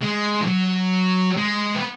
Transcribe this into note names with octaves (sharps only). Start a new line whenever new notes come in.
G#3
E3
F#3
G#3
B3